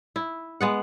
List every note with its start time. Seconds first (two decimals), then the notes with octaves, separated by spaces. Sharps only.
0.16 E4
0.61 G#3 B3 F#5